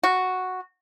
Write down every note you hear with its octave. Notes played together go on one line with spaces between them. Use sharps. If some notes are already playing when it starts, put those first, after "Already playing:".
F#4